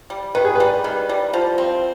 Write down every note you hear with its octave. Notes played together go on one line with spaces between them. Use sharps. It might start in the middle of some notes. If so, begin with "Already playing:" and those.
G3
D#3 B4
G#4
G3 B4
D#3
G3
F3
C4